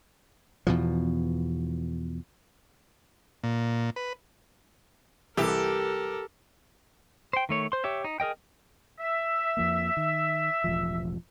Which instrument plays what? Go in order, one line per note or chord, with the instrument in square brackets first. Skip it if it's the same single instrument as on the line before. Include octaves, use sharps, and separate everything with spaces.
[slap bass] E2 B2 F3
[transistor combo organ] A#2
B4
[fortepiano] C2 E3 [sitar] G4 [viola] A4 A#4
[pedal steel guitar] C5 G5
D#3 A3 C#5
C5 C6
G4 C#5 E5
D#4
G#4 A#4 D#5 G5
[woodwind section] E5
[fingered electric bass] F2 F3 A#3
D#3
E1 A1 F3